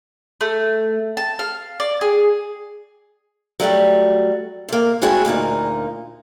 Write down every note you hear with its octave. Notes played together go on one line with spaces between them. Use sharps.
A3
A5
F5
D5
G#4
F#3 G3 A3 F#4
C3 A#3
G#3 A3 C4 E4 F#4 G#4
D2 A#2 A#3 D#4